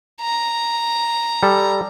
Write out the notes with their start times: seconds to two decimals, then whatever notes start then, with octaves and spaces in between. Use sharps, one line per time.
0.21 A#5
1.43 G3 A4